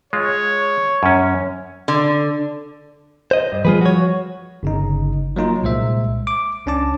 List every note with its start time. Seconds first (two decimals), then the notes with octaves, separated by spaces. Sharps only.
0.13 G#3 F4 C#5
1.03 F#2 C#4
1.88 D3
3.31 C5 D#5
3.52 G2
3.65 F3 G3 F4 G#4 B4
3.81 F#4 C#5
4.63 G1 C#3 D#4
5.36 F#3 A#3 D#4 F4
5.63 C2 A#2 G#3 C5 E5
6.27 D6
6.66 C#2 C#4 D4 A5 D6